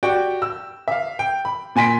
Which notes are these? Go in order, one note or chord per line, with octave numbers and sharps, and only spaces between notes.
F#4 G4 D5 G5
E6
E5 F5
G5
B5
A#2 G#5 C6 B6 D7